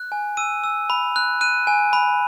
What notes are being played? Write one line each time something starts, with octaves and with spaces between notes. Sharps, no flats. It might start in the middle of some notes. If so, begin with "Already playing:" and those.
Already playing: F#6
G#5
E6 D#7
E6
B5
F#6
F#6 D#7
G#5
B5